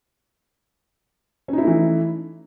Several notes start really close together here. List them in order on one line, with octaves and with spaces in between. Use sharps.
C#4 D#4 E4 A3 E3